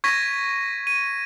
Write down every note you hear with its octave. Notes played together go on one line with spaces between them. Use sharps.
C#6 G#6 A#6 B6 D#7
D#7